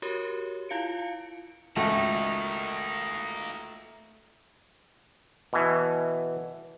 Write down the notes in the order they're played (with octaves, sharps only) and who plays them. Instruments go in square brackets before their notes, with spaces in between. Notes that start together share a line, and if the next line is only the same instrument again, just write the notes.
[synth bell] F#4 G4 A#4 C#5
E4 F4 F5 C#7 D7
[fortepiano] G#1 C#2 [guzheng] A3 [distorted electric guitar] A#3 D#4
[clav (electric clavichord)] B2 E3